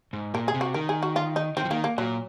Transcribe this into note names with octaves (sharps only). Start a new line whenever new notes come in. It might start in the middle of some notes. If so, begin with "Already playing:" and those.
G#2
A#2 A#4
G#4
C3
F#4
D#3 A#4
G#4
F#4
F4
D#4
D#3 C4
F3
D#3 A#3
A#3
A#2 F#3